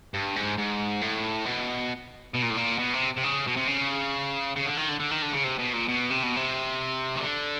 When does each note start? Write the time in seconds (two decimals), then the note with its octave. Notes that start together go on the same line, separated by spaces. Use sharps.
0.14 G2
0.36 G#2
0.58 G#2
1.02 A2
1.46 B2
2.34 B2
2.42 A#2
2.50 A2
2.57 A#2
2.78 B2
2.93 C3
3.17 C3
3.23 C#3
3.47 B2
3.56 C3
3.68 C#3
4.56 C#3
4.66 D3
4.77 D#3
4.89 D3
5.00 D3
5.11 D#3
5.22 D3
5.33 C#3
5.44 C3
5.59 B2
5.74 A#2
5.88 B2
6.11 C3
6.23 B2
6.36 C3
7.16 D#3
7.21 D3